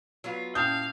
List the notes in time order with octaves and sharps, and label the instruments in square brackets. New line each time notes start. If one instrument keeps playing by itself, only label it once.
[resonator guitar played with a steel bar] F#3 B3 F4
[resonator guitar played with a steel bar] A#2 E4 A5 [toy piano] C#4 D#6 [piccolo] F5 [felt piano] G6